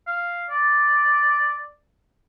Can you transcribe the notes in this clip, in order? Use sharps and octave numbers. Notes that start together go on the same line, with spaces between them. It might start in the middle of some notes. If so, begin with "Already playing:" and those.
F5
D5